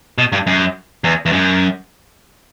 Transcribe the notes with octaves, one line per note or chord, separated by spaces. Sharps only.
B2
G2
F#2
E2
E2
F#2